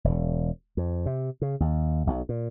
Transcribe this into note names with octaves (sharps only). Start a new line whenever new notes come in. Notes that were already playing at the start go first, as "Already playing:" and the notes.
E1
F2
C3
C#3
D#2
B1
A#2